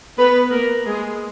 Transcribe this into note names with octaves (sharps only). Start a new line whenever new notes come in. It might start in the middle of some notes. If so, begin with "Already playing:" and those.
B3 B4
A#3 A#4
G#3 G#4